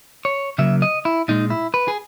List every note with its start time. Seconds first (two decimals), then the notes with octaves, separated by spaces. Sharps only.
0.25 C#5
0.58 C#3 F#3 A#3 E5
0.82 D#5
1.05 E4
1.28 A#2 G#3 D#4
1.50 E4
1.74 B4
1.88 G#4